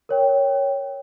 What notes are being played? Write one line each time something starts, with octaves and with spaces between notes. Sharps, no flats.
A#4 C#5 G5